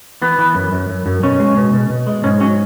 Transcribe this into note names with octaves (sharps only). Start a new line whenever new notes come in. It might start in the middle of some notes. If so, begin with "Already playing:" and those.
E3 B3
E3
F#2
F#2
F#2
F#2
B2 C#4
G#3
B2
B2
B2
G#3
G#2 C#4
F#3 C#4